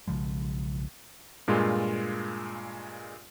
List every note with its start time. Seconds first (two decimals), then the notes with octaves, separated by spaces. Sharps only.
0.08 B1 C#3 F3 G#3
1.48 G2 A#2 G#3 F4